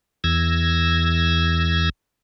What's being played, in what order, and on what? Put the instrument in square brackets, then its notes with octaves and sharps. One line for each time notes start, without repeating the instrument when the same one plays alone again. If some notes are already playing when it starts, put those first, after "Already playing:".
[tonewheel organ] E2 E6 G#6 A#6